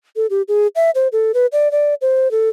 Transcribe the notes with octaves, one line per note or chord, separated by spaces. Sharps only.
A4
G4
G#4
E5
C5
A4
B4
D5
D5
C5
A4